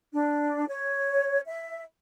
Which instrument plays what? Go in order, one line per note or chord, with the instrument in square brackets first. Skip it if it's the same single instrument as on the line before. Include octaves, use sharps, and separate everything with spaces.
[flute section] D4
C#5
E5